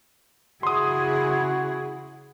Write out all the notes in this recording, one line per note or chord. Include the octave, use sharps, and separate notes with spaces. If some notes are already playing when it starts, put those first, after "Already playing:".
C#3 E4 F#4 G#4 C6 D#6